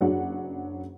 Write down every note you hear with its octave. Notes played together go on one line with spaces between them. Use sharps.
F#1 F#3 D4 G#4 F#5